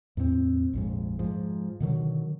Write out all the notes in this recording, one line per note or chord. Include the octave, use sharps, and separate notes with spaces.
E2 A2 A3 C4
A#1 F2 G#2
G#2 F3
B2 D3 D#3 F#3